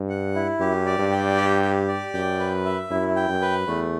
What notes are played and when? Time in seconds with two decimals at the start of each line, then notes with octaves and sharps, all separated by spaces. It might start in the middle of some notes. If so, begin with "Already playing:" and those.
Already playing: G2
0.09 F#5
0.35 E4
0.60 F#2 G4
0.86 D5
0.98 G2
1.12 G5
1.37 G4
1.62 G4
1.88 D5
2.14 F#2 G5
2.39 B4
2.65 E5
2.90 F#2 E4
3.16 G5
3.29 F#2
3.41 B4
3.67 E2 A3